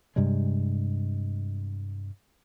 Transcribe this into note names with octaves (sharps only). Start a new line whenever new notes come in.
G2 C3 G3 G#3